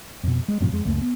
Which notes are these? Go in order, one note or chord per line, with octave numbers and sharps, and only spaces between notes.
F2 B2
G#3
F#2 A2 C3 F3
F2 G#3
C#2 F#2 A3 A#3
B3